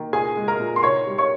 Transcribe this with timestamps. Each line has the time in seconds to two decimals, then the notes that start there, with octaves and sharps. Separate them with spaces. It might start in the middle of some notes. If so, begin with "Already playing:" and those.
Already playing: D#3 A#3
0.13 A#2 G#4 G#5
0.37 G#3
0.48 A#4 A#5
0.60 A#2
0.76 C6
0.83 D#4 C#5 C#6
1.07 G3
1.18 C#5 C#6